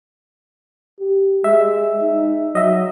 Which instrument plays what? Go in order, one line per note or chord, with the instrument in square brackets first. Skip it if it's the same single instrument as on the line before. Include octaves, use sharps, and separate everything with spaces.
[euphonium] G4
[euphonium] G#3 [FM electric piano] E5
[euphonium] D#4
[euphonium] F#3 [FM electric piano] D#5 E5